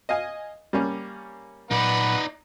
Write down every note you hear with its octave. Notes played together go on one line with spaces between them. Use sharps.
D#5 F5 G#5
G3 A#3 C#4
A#2 F#3 D#4 B4 D5 F#5 B5